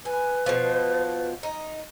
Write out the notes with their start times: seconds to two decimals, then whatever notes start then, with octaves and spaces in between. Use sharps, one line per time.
0.05 B4 G#5
0.46 B2 F3
1.43 D#4